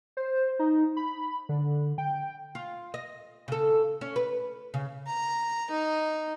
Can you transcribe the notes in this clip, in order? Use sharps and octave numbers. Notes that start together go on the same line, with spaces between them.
C5
D#4
B5
D3
G5
F4
D#5
C#3 A4
C#4
B4
C#3
A#5
D#4